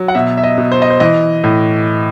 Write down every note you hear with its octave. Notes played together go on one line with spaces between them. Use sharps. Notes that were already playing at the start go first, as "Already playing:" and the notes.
Already playing: F#3
F#5
B2 E5
E5
D#5
B2
C5
D#5
C5
E3 D#5
A2